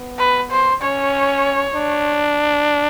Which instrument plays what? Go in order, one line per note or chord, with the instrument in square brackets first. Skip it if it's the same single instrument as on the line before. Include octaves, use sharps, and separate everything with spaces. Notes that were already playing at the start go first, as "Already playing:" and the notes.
Already playing: [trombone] B3
[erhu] B4
C5
[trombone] C#4 [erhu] C#5
[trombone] D4